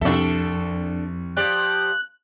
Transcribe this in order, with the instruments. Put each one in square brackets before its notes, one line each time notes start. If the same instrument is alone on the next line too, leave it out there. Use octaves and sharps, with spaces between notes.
[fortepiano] C2 E5 [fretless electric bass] F2 [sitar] D4 A4
[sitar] F3 G4 D5 [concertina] F#6